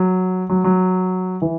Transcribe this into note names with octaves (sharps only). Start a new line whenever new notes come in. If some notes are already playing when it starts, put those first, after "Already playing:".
Already playing: F#3
F#3
F#3
E3